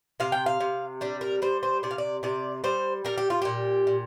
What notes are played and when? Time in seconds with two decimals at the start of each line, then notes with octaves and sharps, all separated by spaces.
0.20 C3 F5
0.32 G5
0.46 F5
0.60 C3
1.01 G3 D4
1.21 A#4
1.42 G3 C5
1.63 C5
1.83 C3 D5
1.91 F5
1.98 D5
2.23 C3 D5
2.64 G3 C5
3.05 G3 A#4
3.18 G4
3.30 F4
3.42 A#2 G4
3.87 A#2